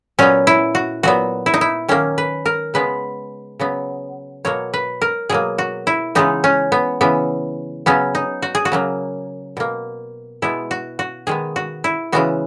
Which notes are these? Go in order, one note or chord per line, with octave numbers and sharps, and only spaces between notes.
A#2 F#3 B3 C#4
E4
F#4
A#2 F#3 B3 F#4
E4
D#4
E4
D#3 F#3 A#3 C#4
B4
A#4
C#3 G#3 B3 B4
C#3 F#3 B3
B2 F#3 A#3 C#5
B4
A#4
B2 F#3 A#3 G#4
F#4
E4
C#3 E3 G#3 B3 D#4
C#4
B3
C#3 E3 B3
C#3 F#3 B3 C#4
D#4
F#4
G#4
F#4
C#3 F#3 A#3
B2 A#3
B2 G#3 B3 E4
F#4
F#4
D#3 G#3 B3 G#4
F#4
E4
C#3 E3 G#3 B3 F#4